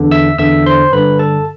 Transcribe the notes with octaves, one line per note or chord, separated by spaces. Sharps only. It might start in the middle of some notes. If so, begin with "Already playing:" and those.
Already playing: E2 D3
E5 E6
E2 D3 E5 E6
C5 C6
G2 D3 B4 B5
A4 A5